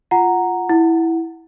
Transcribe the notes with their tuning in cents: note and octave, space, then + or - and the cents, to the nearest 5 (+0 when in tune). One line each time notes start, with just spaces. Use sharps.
F4 -5 F#5 +0 A#5 -5
E4 +0 F#5 +0